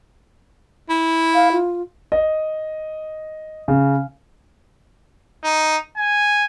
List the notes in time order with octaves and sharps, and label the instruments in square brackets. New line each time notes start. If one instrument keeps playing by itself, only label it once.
[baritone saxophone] E4
[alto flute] F5
F4
[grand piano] D#5
C#3
[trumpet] D#4
G#5